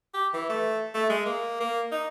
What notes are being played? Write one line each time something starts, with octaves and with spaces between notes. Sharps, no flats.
G4
E3
A3
A3
G#3
A#3
A#3
D#4